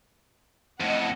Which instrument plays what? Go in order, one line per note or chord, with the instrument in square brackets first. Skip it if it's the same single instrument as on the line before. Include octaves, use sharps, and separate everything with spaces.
[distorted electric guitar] F2 A2 [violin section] D#5 F#5